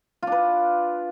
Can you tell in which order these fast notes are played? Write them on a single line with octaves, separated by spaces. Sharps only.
F4 D4 B4